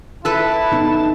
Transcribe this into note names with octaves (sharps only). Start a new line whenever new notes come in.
E4 A4 B4 A5
B3 D#4